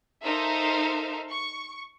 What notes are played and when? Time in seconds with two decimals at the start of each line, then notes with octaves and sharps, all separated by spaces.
0.24 D#4 A4 A#4 C5 E5 F5
1.30 C#6